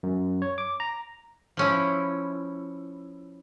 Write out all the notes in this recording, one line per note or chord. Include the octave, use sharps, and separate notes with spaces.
F#2
C#5
D6
A#5
F3 C#4 E4